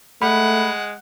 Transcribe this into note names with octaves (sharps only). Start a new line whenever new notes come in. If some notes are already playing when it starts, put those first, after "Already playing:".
G#3 A3 F#5 B5